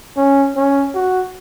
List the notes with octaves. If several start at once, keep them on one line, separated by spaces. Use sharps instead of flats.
C#4
C#4
F#4